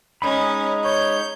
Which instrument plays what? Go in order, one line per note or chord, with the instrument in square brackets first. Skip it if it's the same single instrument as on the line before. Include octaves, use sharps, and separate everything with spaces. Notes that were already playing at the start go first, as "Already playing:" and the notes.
[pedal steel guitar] G#3 D#4 B5 [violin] C#4
[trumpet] C#5 [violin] G6